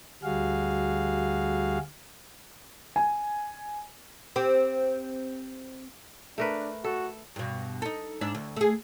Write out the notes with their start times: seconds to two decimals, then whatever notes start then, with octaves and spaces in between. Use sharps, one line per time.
0.23 D2 G3 F#4 G#4 F5
2.96 G#5
4.36 C4 G4
6.38 A3 D4 A#4 B4
6.84 F#4 A4
7.36 G2 B2
7.82 D#4 A4
8.21 G#2 D4 E5
8.35 D2
8.56 A3 G#4